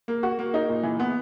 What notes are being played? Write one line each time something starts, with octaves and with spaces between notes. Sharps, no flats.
A#3
F#4
A#3
D#4
A#2
E3
B3